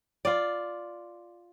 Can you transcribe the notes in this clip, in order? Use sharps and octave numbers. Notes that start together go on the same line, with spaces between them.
F4 D5